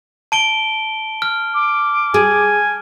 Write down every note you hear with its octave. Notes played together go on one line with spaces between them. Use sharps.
A5 D7 G7
F6
D6
G#4 G#5